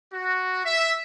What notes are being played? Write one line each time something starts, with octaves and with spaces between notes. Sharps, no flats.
F#4
E5